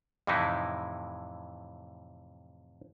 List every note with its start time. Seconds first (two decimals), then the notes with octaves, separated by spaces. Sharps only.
0.27 F2 A2 C3 E3 D#4 E4